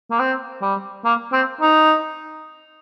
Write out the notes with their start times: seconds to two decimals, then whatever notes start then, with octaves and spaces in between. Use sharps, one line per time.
0.11 A#3
0.19 C4
0.62 G3
1.05 A#3
1.32 C4
1.61 D#4